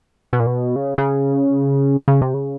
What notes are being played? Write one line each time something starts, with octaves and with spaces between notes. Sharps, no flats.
B2
A#2
B2
C#3
C#3
C#3
C3
C#3